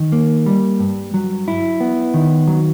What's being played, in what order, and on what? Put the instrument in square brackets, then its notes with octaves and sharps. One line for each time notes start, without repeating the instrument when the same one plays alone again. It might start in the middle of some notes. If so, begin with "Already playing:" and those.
Already playing: [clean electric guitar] D#3
A#3
G3
G2
F#3
E4
B3
D#3
F#3